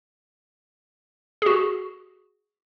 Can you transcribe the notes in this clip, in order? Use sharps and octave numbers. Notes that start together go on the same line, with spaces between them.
F#4 G#4